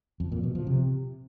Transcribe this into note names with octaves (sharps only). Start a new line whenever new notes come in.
F2
A#2
B2
F3
C3